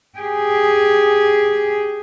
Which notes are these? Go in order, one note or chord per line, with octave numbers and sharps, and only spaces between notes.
G4 G#4